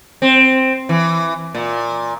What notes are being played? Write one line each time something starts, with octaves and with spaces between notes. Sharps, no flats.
C4
E3
A#2